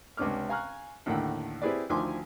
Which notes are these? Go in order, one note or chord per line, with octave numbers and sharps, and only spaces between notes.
C#2 C3 C#4 D4 D6 F6
F5 G#5 A#5 C#6 F6 F#6
D#2 A2 D3 F#5 G5
C4 E4 G4 G#4 B4 D5
D2 D#3 F3 G#5 C6 D6